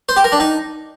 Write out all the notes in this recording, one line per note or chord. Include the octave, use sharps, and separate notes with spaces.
C5
G4
A#4
D4
D#4